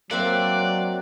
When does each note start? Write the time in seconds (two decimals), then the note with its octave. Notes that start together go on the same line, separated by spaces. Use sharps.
0.11 F#3 A#3 C4 D5 E5 F#6